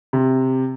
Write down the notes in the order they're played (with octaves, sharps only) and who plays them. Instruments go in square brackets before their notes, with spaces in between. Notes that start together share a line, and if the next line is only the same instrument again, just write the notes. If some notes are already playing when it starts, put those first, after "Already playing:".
[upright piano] C3